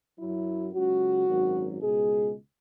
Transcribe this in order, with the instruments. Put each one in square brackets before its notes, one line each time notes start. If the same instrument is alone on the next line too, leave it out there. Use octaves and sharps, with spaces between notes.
[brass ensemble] F#2 F#3 E4
C#2 C#3 F#3 F#4
G#1 F#2 F#3
C#2 B2 G#3 G#4